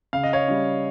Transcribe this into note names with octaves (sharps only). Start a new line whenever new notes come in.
C#3 F5
D#5
C#5 F5
G3 C#4